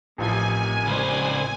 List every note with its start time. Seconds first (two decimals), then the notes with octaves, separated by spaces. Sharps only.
0.18 A1 A2 C3 D#3 F3 G#5
0.87 C#2 C5